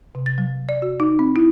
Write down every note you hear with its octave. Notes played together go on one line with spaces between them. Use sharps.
C3
A6
F#3
D5
F#4
D#4
C4
E4